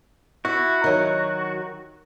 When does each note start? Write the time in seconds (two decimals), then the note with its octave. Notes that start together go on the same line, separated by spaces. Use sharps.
0.45 E4 F#4
0.84 D#3 F#3